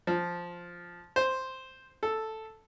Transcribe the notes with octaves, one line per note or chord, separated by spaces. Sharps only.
F3
C5
A4